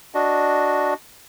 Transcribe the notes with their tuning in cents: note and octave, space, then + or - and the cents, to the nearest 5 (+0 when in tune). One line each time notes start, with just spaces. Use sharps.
D4 +0 F#4 +0 D#5 +0